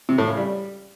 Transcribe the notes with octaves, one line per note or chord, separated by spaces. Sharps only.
C3
A2
C#3
G3